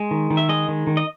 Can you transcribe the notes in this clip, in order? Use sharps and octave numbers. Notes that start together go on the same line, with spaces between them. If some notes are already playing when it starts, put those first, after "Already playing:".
Already playing: G#3
D#3
D#3
E5
G#3 D#5
D#3
D#3
D#5